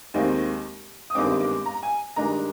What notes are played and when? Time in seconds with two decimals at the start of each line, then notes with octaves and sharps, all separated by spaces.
0.14 D#2 D#3 G#3 C4
1.10 D#6
1.15 G1 G2 D#3 G#3 C4 D6
1.40 D6
1.66 A#5
1.83 G#5
2.16 G2 D#3 G#3 D4 A#5